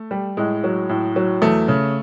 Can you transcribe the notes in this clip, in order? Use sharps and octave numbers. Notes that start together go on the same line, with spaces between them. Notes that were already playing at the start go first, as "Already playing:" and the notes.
Already playing: A3
G3
A2 G#3
F#3
A2
F#3
E2 A3
C#3